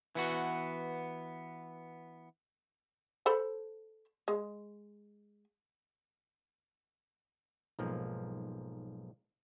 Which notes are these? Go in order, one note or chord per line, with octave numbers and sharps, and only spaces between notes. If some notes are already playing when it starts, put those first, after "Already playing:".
E3 B3 F#4
A4 C5 B5
G#3
B1 G#2 F3 A#3